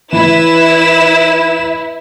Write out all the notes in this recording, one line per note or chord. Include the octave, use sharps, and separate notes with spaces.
E3 E4 B4 E7